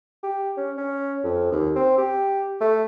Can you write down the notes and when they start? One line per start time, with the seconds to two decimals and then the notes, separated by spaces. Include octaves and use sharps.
0.23 G4
0.57 C#4
0.77 C#4
1.24 F2
1.52 D#2
1.76 C4
1.98 G4
2.61 A3